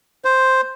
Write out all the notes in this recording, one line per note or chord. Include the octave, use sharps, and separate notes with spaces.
C5